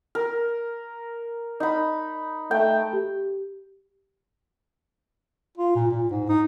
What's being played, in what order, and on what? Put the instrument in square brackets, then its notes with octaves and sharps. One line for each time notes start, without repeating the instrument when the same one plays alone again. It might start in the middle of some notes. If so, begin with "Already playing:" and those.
[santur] A#4
D#4 B5
[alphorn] A3 [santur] G5
[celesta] G4
[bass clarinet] F4
A#2
A#2
G#2
D#4